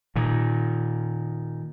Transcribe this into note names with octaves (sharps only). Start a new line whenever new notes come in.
A#2 D#3